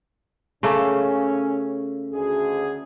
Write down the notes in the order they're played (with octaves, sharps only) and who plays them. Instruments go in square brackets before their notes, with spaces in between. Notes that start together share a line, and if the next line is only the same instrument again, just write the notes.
[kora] C#3 A3 A#3 [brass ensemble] C#4
[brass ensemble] D2 G#4